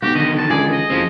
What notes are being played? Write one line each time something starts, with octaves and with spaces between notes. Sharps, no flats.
B1 F#4 G4
D3 D#3 D#5
A5
C#2 G#4 D5
D#5
F#1 F3 C4